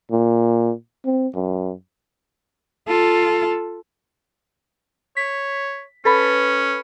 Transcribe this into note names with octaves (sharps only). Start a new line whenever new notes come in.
A#2
C4
F#2
F4 A4
C#5 B6
C#4 A4 B4 B5